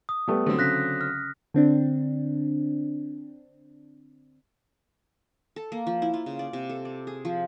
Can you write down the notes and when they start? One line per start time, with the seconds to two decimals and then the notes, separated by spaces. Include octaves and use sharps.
0.09 D#6
0.28 G3 A3 B3
0.46 D3 F#3 C4
0.59 C#3 F#6 A#6 B6
1.01 F6
1.54 D3 C4 D4
5.56 A4
5.72 A#3
5.87 F3
6.02 E4
6.14 F4
6.26 C#3
6.39 D5
6.53 C3
6.69 A4
6.85 D5
7.07 G#4
7.25 F3